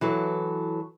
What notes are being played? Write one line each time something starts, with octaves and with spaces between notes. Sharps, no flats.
E3 F#3 A4